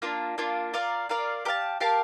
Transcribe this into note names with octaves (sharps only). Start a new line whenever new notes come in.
A#3 D4 F4
A#3 D4 F4
F4 A#4 D5 F5
F4 A#4 D5 F5
G4 A#4 F5 A5
G4 A#4 F5 A5